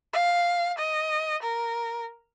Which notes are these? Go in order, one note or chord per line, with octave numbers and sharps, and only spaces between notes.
F5
D#5
A#4